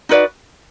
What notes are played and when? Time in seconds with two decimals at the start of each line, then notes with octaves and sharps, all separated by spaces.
0.09 D#4 F#4 B4 D5